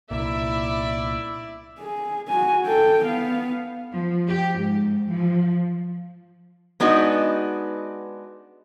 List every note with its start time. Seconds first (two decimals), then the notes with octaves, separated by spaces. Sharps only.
0.11 C2 A#2 E4 D5 E5
1.79 G#4
2.28 F#4 G#5
2.66 A4 G5
3.05 B3 F5
3.92 F3
4.29 G4
4.59 G#2
5.09 F3
6.80 G#3 B3 D4 D#4 F#4